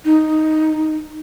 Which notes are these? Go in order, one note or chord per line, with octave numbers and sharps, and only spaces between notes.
D#4